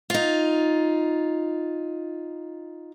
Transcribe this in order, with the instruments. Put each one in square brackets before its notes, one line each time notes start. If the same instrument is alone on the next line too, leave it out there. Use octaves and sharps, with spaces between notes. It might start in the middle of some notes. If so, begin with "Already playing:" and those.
[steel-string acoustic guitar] D#4 F4